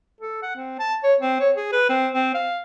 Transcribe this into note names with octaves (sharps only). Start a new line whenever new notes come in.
A4
F#5
C4
A5
C#5
C4
C#5
G#4
B4
C4
C4
F5